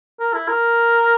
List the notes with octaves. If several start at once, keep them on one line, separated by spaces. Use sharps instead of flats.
A#4
E4
A#4